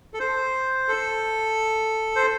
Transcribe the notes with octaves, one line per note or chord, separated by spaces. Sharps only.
A4
C5
A4
C5